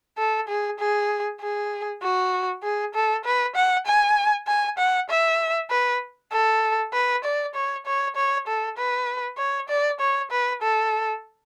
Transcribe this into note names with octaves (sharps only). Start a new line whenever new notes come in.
A4
G#4
G#4
G#4
F#4
G#4
A4
B4
F#5
G#5
G#5
F#5
E5
B4
A4
B4
D5
C#5
C#5
C#5
A4
B4
C#5
D5
C#5
B4
A4